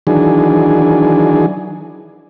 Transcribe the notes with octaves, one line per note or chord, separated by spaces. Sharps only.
D#3 E3 F#3 D4 G#4